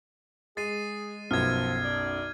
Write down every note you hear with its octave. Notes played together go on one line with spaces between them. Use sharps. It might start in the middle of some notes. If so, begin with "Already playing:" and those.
G#3 G#4 A6 C7 D#7
B1 F#2 F3 B3 F6 G#6
D5